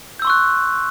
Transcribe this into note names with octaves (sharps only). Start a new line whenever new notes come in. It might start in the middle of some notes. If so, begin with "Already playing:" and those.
C6 C#6 E6 F#6 G6